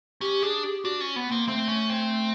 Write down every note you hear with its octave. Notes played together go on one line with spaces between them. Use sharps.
C#4 G4
D4 G#4
G4
D4 F#4
C#4
B3
A#3 C4
A3 C4
C#4
C4